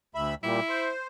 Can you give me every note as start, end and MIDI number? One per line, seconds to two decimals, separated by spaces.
0.15 0.34 38
0.15 0.34 76
0.15 0.34 83
0.43 0.60 46
0.43 0.60 55
0.43 0.89 64
0.69 1.07 72